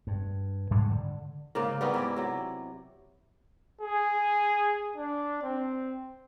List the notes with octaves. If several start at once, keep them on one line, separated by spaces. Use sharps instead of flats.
G2
G#2 G3 G#3 D4
D3
G#2 C#3 A#3
G3 B3 C#4 D#4
G#2 E4 D5
C3 F#3
G#4
D4
C4